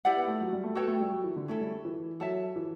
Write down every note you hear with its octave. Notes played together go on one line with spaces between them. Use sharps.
E4 G4 D5 F#5
B3
A3
F#3
G3
A3
B3 F#4 A4 C#5 G5
A3
G3
F#3
E3
D3
A3 C#4 E4 A4
G3
E3
F#3 A4 C#5 E5 A5
E3